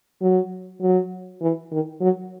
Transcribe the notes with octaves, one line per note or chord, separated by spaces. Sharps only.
F#3
F#3
E3
D#3
F#3